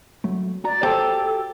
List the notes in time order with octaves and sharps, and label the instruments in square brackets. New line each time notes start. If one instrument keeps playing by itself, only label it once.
[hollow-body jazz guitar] F#3 A3
[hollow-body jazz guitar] F#4 A#5 [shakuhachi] D5
[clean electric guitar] G4 [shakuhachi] A4 [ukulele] C5 G5 A5